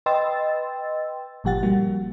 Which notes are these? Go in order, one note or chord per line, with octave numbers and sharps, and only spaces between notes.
B4 D#5 G5 C6 E6 A6
G1 A#2 F3 G4 F#5 A6
G3 A#3 F#4